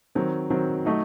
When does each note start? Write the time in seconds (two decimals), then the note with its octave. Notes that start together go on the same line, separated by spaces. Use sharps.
0.15 D#3 F#3 C4
0.50 D#3 F#3 C4
0.85 F#3 A3 D#4 F#4